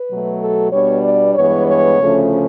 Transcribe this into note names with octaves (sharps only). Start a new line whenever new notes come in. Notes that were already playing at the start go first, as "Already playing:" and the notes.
Already playing: B4
B2 F#3 A3
A4
B2 G3 B3 D4 C#5
D5
G2 E3 G#3 B3 C#5
C#5
D2 C#3 F3 A3 C#4